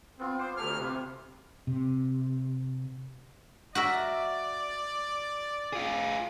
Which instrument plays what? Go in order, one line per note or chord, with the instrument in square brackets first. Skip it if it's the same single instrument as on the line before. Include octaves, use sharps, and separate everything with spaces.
[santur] B3 F4 [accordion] C4
[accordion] C5 [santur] F5 D6
[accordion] D2 F6 [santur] G4 A4 G#5
[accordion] C3 [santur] F4 B4
[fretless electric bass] C3
[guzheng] F#4 A#4 E5 [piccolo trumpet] D5
[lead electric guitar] F4 G#4